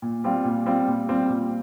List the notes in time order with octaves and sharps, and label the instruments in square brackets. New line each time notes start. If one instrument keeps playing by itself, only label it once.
[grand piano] A#2
G3 C4 F4
A#2
G3 C4 F4
A#2
G3 C4 F4
A#2